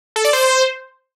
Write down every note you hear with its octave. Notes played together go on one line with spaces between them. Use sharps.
A4
D5
C5